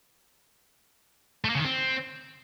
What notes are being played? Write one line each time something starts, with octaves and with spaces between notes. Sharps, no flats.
A3
A#3
C#3
D#3
C4